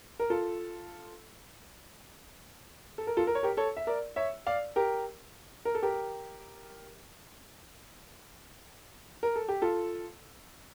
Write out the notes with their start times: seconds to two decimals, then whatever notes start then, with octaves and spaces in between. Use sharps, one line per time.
0.20 A#4
0.30 F4 A4
2.98 A4
3.07 A#4
3.17 F4 A4
3.27 A#4
3.35 C#5
3.43 G4 A#4
3.57 A4 C#5
3.77 E5
3.87 A#4 D5
4.16 C#5 E5
4.47 D5 F5
4.76 G4 A#4
5.65 A#4
5.75 A4
5.83 G4 A#4
9.23 A#4
9.36 A4
9.48 G4
9.62 F4 A4